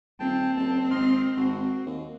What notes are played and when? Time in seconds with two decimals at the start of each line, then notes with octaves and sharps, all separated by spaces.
0.20 D#1 C4 G5 A5
0.57 F#1 A5
0.91 G#1 D#5 C6 F6
1.37 G#1 F#4
1.86 D#2